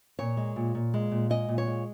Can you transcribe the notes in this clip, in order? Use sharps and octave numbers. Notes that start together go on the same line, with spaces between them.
A#2 C#5
G#3
A#2
A#2
G#3
A#2
G#3 D#5
A#2
C#5
G#3